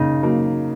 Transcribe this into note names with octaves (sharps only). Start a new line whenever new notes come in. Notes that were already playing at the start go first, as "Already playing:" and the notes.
Already playing: C#3 A#3 D#4
F#3 A#3